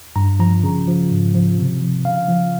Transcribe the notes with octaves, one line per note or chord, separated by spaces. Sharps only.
G2 A#5
F3 A#5
C#3
F3
G#2
F3
C3
F3
C#3 F5
F3